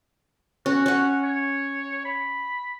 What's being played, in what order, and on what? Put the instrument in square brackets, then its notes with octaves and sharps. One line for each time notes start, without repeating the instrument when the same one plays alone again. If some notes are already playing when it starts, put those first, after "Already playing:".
[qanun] C#4 [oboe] F#4
[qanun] C#4 F#5
[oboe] C#5
B5